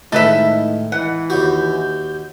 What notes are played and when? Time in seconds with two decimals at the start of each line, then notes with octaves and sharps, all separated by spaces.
0.12 A2 D#3 G#3 D#4 A4 B4 E5
0.92 E3 F#5
1.30 D#2 F#4 G6